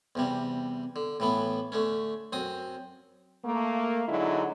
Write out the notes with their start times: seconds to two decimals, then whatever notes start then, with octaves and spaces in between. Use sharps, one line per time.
0.15 E2 C3 G3
0.96 D3
1.20 A2 E3 B3
1.72 D3 A3 C#4
2.33 F#2 C4 D#6
3.44 A3 A#3
4.09 D3 F#3 G#3 D#4 E4